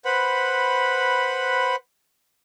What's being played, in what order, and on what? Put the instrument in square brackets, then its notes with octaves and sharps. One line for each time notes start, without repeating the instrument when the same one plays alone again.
[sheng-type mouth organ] B4 C5 F#5 B5